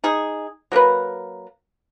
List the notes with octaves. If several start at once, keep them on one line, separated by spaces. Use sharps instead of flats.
D#4 G#4
F#3 A#3 A#4 B4